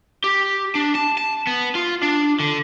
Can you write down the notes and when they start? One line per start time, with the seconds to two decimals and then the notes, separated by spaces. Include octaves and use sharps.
0.24 G4
0.75 D4
0.95 A5
1.17 A5
1.47 B3
1.75 F4
2.03 D4
2.40 D3